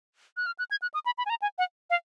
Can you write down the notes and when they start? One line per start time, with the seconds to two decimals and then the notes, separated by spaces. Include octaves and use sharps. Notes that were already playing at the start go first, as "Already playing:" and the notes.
0.37 F#6
0.46 F6
0.59 F#6
0.71 G#6
0.82 F#6
0.94 D#6
1.06 B5
1.18 B5
1.26 G#5
1.30 A#5
1.42 G#5
1.58 F#5
1.90 F5